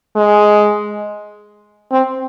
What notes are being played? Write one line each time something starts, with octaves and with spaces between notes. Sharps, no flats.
G#3
C4